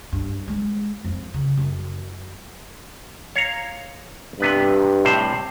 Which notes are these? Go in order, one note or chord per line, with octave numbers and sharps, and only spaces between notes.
G2
G#3
F2
C#3
F#2
C#5 F5 A#5
G2 C3 B3 B4
A2 C3 C5